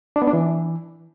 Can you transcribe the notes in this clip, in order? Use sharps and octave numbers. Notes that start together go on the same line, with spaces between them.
D4
B3
D4
E3